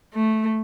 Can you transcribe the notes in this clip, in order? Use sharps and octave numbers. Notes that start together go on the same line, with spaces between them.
A3